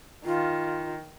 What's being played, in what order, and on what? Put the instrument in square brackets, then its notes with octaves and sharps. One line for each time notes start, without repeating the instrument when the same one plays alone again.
[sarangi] D#3 [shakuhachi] F4